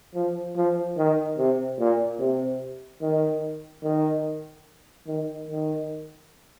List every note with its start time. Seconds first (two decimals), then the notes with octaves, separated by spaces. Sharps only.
0.15 F3
0.56 F3
0.97 D#3
1.38 C3
1.79 A#2
2.20 C3
3.01 D#3
3.84 D#3
5.07 D#3
5.48 D#3